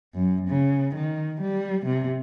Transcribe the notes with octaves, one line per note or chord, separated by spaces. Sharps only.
F#2
C#3
D#3
G3
C3